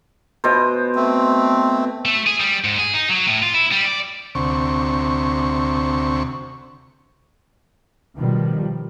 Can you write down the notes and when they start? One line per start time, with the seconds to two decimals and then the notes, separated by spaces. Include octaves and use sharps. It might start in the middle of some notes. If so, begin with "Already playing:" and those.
0.44 B2 C5
0.95 A3 C4
2.05 A3
2.27 G#4
2.40 G3
2.64 G#2
2.78 G#4
2.94 D#4
3.09 F#3
3.27 A2
3.42 F4
3.54 E4
3.71 G3
3.85 D5
4.35 D2 C3 C#6
8.16 B2 D#3 F3 G3